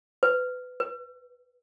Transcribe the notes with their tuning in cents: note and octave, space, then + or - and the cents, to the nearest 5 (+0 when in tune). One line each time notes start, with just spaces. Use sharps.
B4 +25
B4 -20